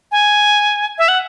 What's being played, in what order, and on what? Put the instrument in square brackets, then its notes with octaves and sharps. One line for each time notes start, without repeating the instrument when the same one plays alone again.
[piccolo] G#5
E5
F#5